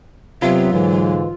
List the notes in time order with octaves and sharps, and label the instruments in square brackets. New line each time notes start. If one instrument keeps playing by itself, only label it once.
[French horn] C3 [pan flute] F#3 [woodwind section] B3 E5 [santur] F4
[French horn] G#2 [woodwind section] B2 D3 E3